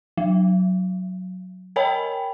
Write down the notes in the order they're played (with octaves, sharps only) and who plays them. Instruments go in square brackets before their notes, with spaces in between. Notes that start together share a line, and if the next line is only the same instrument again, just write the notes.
[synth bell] F#3
A#4 C#5 D#5 G5 G#5 B5